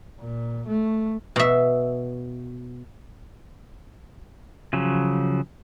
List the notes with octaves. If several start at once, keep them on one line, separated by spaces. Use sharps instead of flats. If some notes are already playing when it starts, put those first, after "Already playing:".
A#2
A3
B2 E5
C#3 F3 F#3